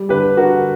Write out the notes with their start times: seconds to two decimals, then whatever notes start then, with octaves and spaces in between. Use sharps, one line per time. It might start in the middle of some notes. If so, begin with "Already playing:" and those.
Already playing: G3
0.09 D3 G4 B4
0.37 D3 F#4 A#4